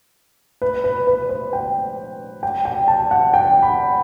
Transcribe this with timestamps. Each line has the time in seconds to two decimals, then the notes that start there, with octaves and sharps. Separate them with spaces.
0.62 B4
0.84 B4
1.07 B4
1.29 C5
1.53 G5
2.43 G5
2.65 G5
2.88 A5
3.11 F#5
3.34 G5
3.62 B5